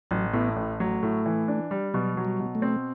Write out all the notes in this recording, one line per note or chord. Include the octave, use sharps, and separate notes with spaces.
A1 F#3
A2 B3
A1
F#3 A3
A2
E3
D4
G3
B2 F#3
F#3
G3
B2
A3
C4